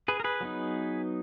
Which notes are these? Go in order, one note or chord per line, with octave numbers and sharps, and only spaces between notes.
G#4 B4
A#4
G#4 B4
F#3 B3 D#4